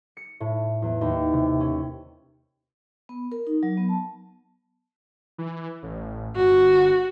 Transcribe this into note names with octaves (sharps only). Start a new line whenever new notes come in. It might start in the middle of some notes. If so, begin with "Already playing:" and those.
C#7
A2
E2
D#2
C3
C#4
B3
A#4
D#4
F#3
B3
A5
E3
A1
G1 F#4